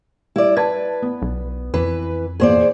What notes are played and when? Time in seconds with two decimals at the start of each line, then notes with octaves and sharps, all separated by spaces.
0.36 G3 E4 D5 E5
0.57 B4 A5 G#6
1.02 B3
1.22 B1
1.74 F2 E3 B4
2.40 E2 A#2 G#4 C5 D5